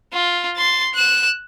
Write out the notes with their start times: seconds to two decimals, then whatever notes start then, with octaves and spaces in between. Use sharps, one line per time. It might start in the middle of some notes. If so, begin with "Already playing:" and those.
0.13 F4
0.57 C6 A6
0.94 F#6 E7